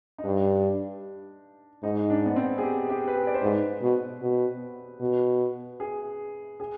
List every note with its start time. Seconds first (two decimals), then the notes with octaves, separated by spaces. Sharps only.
0.18 D#4
0.24 G2 D4
1.83 G#2 D#4
2.10 D4
2.26 B3
2.36 C4
2.58 G#4
2.62 G4
2.90 G4
3.08 B4
3.16 G#4
3.27 D5
3.34 C5
3.42 G#2 B4
3.82 B2
4.22 B2
5.01 B2
5.80 G#4
6.60 G#4